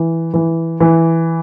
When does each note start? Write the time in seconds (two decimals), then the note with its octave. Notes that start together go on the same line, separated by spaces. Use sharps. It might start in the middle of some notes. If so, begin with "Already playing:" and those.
Already playing: E3
0.34 E3
0.80 E3